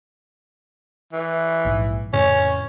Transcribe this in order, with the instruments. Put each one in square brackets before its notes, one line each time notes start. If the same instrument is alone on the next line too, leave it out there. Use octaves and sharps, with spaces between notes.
[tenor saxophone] E3
[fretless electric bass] A#1 G#2
[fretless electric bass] F2 A2 C#3 [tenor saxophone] C#4